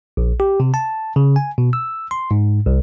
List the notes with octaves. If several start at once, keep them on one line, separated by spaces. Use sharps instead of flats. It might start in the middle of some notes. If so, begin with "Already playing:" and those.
A#1
G4
C3
A5
C#3
G#5
B2
E6
C6
G#2
C2